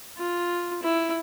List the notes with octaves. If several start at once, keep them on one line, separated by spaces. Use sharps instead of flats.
F4
E4